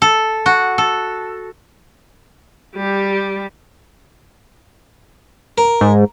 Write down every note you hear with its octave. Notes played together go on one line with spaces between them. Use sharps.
A4
F#4
A4
G3 G4
A#4
G#2